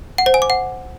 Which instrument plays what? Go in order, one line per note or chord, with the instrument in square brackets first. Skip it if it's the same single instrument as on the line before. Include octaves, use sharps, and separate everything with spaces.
[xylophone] F#5
C5
G#5
D6
F#5